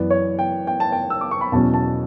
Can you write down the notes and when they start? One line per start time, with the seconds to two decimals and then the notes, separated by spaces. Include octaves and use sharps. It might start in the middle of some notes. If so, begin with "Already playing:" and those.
Already playing: F#2 E3 B3 D5
0.10 C#5
0.39 G5
0.67 G5
0.80 A5
0.92 G5
1.10 E6
1.21 D6
1.31 C#6
1.41 B5
1.52 E2 B2 F#3 C#4 A5
1.74 A5